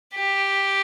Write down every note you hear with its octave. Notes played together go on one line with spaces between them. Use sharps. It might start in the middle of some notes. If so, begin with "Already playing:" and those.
G4